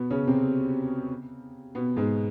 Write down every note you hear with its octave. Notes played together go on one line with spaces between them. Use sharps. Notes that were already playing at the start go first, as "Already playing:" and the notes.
Already playing: B2 B3
C#3 C#4
C3 C4
B2 B3
G#2 G#3